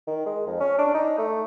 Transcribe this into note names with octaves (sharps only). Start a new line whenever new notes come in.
D#3
G#3
F2
C#4
D4
D#4
A3